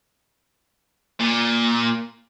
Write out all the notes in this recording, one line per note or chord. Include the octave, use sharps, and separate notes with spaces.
A#2